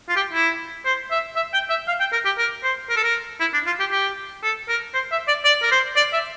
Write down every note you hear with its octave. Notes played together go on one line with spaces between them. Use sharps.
F4
G4
E4
C5
E5
E5
G5
E5
F5
G5
A#4
G4
A#4
C5
A#4
A4
A#4
E4
D4
F4
G4
G4
A4
A#4
C5
E5
D5
D5
A#4
C5
D5
E5